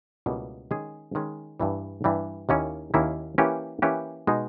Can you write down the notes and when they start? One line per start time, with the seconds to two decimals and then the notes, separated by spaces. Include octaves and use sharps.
0.26 C#2 B2 G3 A#3 E4
0.71 D#3 G#3 C#4 G#4
1.15 D#3 G#3 C#4 G#4
1.60 G2 E3 G3
2.04 G2 E3 G3
2.49 D#2 D#3 A#3 C#4 E4
2.94 D#2 D#3 A#3 C#4 E4
3.38 E3 A#3 C#4 G4 B4
3.82 E3 A#3 C#4 G4 B4
4.27 B2 G#3 D#4